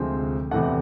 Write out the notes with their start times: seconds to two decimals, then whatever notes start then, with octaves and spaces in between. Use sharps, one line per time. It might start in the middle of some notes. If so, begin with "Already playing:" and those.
Already playing: D2 C3 F3 G#3 C4
0.51 E2 C3 E3 A3 F#5